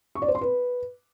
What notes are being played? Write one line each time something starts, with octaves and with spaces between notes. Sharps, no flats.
C#6
D5
C5
C6
B4